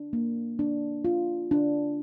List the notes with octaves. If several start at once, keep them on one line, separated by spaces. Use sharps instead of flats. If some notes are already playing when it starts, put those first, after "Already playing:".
Already playing: D4
A#3
D4
F4
D4